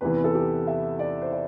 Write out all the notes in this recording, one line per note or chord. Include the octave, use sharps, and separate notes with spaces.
E2 C3 E3 B4
A4
G4
E5
D5
C5
D5